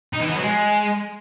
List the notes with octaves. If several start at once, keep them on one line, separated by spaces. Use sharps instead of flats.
D#4
E3
B3
F#3
G#3